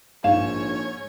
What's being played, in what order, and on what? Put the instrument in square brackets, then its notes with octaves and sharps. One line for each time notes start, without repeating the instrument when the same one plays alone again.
[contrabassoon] A#1 [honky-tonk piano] G#2 E7 [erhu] C#5 [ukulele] F5